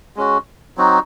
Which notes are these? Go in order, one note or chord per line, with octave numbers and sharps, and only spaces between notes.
G#3 C#4 F#4
F#3 C4 D#4 F#4